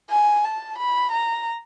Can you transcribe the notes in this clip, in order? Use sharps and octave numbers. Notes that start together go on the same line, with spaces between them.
G#5
A5
B5
A#5